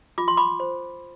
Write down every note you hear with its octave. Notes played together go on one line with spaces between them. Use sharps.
F4 D6
C6
B5 D6
C5